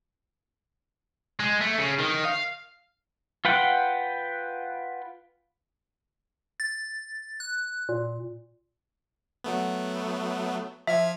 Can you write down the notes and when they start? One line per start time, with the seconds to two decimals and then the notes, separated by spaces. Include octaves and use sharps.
1.40 G#3
1.61 A3
1.78 C#3
1.99 D#3
2.25 F5
3.45 F4 B4 F#5 G5
6.60 A6
7.40 F#6
7.89 A#2
9.44 F#3 A3 B3
10.87 F3 E5 F6 G#6